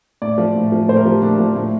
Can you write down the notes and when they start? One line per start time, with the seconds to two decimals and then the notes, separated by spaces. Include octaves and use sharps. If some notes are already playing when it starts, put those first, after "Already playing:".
0.22 A2 D5
0.38 F3
0.56 A2
0.72 F3
0.88 A2 C5
0.96 A#4
1.06 F3 G4
1.22 A2 D4
1.38 F3
1.56 A2